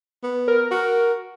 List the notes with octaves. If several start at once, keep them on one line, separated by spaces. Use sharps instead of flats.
B3
A#4
F#4